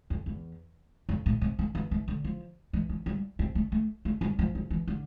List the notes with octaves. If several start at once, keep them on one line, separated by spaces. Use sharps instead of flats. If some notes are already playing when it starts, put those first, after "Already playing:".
F2
E2
F2
A2
C3
D3
E3
E3
D3
F3
E3
E3
G3
C4
A3
A3
A3
G3
F3
F3
E3
D3